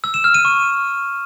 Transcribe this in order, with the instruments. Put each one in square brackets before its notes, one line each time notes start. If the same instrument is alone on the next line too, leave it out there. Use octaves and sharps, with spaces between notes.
[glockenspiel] E6
E7
F6
D#7
C#6